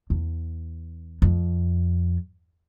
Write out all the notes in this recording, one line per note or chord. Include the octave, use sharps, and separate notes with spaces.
E2
F2